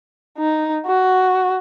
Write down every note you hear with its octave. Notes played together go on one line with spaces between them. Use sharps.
D#4
F#4